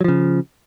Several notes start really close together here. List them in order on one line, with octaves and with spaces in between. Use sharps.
F#3 F3 C#3